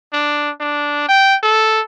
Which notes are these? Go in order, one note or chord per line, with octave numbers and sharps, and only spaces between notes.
D4
D4
G5
A4